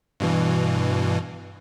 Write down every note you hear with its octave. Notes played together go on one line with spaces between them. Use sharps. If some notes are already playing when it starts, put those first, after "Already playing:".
G2 B2 E3